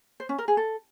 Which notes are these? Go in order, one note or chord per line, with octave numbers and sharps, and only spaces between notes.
C5
C#4
A#4
G#4
A4